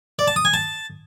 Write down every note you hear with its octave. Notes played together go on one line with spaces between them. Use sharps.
D5
A5
D#6
G#5
A5